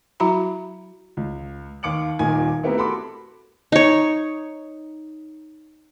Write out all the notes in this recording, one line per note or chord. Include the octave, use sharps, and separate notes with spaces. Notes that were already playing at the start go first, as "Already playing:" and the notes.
F#3 E4 F#4 A#5 B5
C#2
D#2 F5 D6 C#7 F#7
D#1 A#2 D#3 D#4 G#5 G#6
A3 B3 C4 E4 G4 A#4
F#4 A4 B5 C6 D6
D#4 C#5